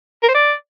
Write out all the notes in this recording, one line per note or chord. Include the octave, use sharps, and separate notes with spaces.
A#4
C5
D5